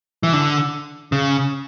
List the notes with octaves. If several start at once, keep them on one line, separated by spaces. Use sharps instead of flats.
E3
D3
C#3